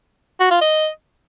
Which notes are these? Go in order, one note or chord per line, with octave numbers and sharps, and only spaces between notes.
F#4
F4
D#5